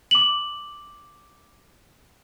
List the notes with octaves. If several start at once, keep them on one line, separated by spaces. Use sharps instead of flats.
D6 F#7